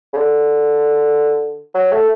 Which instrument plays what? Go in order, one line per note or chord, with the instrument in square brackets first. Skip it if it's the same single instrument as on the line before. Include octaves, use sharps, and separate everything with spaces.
[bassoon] C#3
D3
F#3
A3